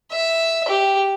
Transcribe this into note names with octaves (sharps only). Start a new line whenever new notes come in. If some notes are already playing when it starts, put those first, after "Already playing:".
E5
G4